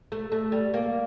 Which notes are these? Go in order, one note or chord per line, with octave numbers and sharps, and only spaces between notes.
A3
A3
G3
A#3